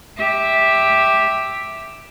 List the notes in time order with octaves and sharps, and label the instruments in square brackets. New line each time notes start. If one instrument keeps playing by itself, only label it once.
[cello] G4 E5